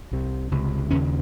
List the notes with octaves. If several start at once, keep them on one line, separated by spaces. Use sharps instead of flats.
C2 C3
C#2 C3
D#2 C#3 C#4